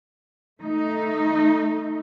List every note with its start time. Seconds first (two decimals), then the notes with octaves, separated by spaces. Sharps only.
0.62 A3 D#4